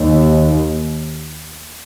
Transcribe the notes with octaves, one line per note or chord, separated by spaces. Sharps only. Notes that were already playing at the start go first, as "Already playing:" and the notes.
Already playing: D#2